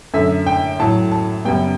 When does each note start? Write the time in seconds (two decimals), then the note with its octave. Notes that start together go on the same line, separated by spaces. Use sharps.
0.14 F#2 D3 A3 E5
0.47 G5
0.79 A2 F#3 A3 A5
1.12 A5
1.45 F#2 C#3 G3 B3 G5